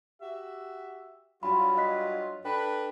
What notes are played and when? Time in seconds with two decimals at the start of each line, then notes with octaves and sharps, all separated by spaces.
0.21 F#4 G4 E5
1.43 G2 F#3 F4 B5
1.77 D#5 F#6 B6
2.45 D4 A4 B4 G5